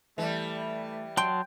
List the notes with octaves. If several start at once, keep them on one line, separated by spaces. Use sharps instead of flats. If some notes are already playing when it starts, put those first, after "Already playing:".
E3 G3 A3
F#3 G5 A5 C6